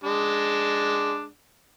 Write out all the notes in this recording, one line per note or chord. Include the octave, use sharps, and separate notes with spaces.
G#3 D4